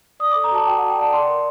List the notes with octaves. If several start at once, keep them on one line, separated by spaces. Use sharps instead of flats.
D5 D#6
D6
A4
A#5
F#4 A5
F#4 G5
F#5
F#4
G5
D5 A5
D5 C6
A#4